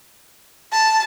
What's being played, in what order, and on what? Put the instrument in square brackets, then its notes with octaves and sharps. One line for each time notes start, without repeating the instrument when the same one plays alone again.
[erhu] A5